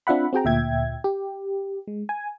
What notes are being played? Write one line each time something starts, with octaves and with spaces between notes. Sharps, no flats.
C4 D4 F4 E5 F#5 B5
C4 F#4 G#4 G5 A#5
D2 A#2 E5 G5 G#6
G4
G#3
G#5